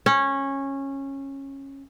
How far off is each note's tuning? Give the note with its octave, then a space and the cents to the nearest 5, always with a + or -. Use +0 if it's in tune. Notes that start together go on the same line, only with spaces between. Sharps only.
C#4 -15